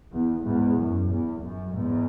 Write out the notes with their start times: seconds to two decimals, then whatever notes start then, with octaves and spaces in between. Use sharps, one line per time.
0.13 E2
0.45 E2 G#2
0.78 F#2
1.11 E2
1.44 F#2
1.76 E2 G#2